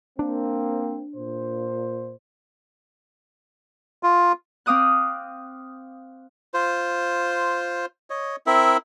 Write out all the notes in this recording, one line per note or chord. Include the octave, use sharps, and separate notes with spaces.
A#3 C4 D4
A#2 C5
F4
C4 F5 D6 D#6 F#6
F4 C5
C#5 D#5
C4 E4 A#4 E5